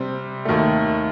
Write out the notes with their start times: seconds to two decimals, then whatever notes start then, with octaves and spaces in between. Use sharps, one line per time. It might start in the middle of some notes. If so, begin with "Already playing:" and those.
Already playing: C3 G3 C4
0.45 D#2 D#3 A3